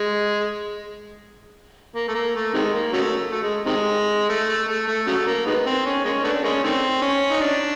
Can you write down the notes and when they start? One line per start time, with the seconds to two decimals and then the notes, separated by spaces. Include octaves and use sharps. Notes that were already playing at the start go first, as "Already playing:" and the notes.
Already playing: G#3
1.95 A#3
2.09 A3
2.15 A#3
2.35 A3
2.54 C3 D#3 G#3
2.74 A#3
2.93 C#3 F#3 A3
3.32 A3
3.43 G#3
3.66 C3 D#3 G#3
4.30 A3
4.49 A3
4.68 A3
4.88 A3
5.07 C#3 F#3 A3
5.27 A#3
5.46 D#3 G#3 B3
5.66 C4
5.86 C#4
6.05 G#3 A#3 C#4
6.24 A3 B3 D4
6.44 G#3 A#3 C#4
6.64 D#3 A3 C4
7.02 C#4
7.31 D#4
7.41 D4